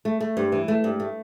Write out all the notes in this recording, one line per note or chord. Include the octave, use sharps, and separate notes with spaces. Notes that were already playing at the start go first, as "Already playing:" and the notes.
A3
A3
G2
E3
A3
G2
A3